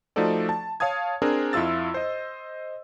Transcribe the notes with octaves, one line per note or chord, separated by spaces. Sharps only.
F3 A3 D#4 F#4 A4 D5
A5
C#5 F5 A5 D#6 G#6
C4 D4 G#4 A#4
F2 E4 F4 E6 A6
C5 D#5